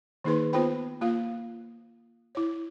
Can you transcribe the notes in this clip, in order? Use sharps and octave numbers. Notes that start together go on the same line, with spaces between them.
D#3 A#3 D#4 G#4 B4 C6
B3 F4 B4 C5 G5 B5
A#3 F4 F5
E4 C#5